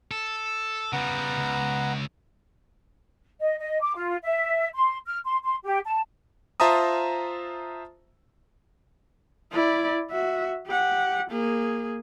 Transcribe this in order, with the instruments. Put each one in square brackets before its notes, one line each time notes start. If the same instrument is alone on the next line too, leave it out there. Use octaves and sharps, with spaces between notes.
[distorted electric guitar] A4
[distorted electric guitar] C#3 G3 [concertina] B3 F#5 A#5
[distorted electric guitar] C#2
[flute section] D#5
D#5
D6
F4
E5
C6
F6
C6
C6
G4
A5
[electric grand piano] F4 C5 E5 A5 A#5 D#6
[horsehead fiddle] E4 D5
F#4 E5
G4 F#5
A#3 G#4